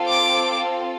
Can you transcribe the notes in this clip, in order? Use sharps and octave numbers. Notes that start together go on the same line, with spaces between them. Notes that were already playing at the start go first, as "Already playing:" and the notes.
Already playing: C4 F4 A4
D6